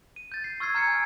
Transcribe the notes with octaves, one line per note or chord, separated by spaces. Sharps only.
D#7
G6 A6
C7
C#6 E6 F6 G#6 A6 C7
A#5 F6 G#6 C7 C#7
G#5